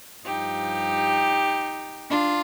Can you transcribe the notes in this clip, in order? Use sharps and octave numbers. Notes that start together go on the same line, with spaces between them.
G2 F3 D#4 G4
D4 F4